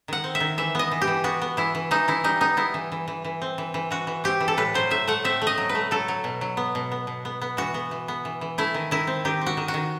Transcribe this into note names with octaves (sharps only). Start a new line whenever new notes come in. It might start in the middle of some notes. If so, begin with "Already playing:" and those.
D#3 F#5
C4
E5
D#3
E3 E5
B3 D#5
E3
G4
E3
B3 F#4
B3
E3 E4
E3
E3 D#4
E3 E4
G3 D#4
B3 D#4
B3 E4
E3
E3
E3
E3
C4
E3
E3
E3 F#4
E3
C4 G4
E3
A4
A2 B4
F#3 C5
A2 E5
A3 F#5
C4 E5
A3
D#5
F#3
B4
A3
F#3 A4
F#3
B2
F#3
B3
B2
B3
B2
B3
B3
E3 F#4
B3
E3
B3
E3
E3
A3 E4
D#3
D#3 E4
C4
D#3 G4
C4
F#4
D#3
F#4
D#3